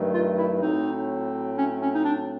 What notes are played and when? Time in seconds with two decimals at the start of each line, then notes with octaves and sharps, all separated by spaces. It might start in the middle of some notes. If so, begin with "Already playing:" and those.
Already playing: G2 D#3 F#3 A3
0.14 F4
0.38 E4
0.61 A2 F#3 A3 C4 D#4
1.57 C#4
1.81 C#4
1.93 D#4
2.05 D4